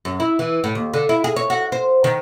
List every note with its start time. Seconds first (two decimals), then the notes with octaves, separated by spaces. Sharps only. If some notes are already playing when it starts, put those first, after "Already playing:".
0.05 F#2
0.20 E4
0.39 E3
0.64 A2
0.75 D#2
0.94 D3
1.09 E4
1.24 G#4
1.36 C#5
1.50 F#4
1.72 C5
2.04 D#3